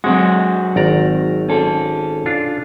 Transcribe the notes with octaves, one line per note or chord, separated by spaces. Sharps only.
F#3 G#3 C4 F#4
G#1 D5 A#5
C#4 A4
D4 F4